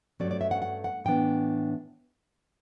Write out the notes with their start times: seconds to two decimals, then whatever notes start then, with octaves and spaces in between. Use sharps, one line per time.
0.20 G2 F#3 A3 C#4 D5
0.31 D5
0.41 E5
0.51 F#5
0.62 F#5
0.84 F#5
1.05 A2 E3 B3 D4 G5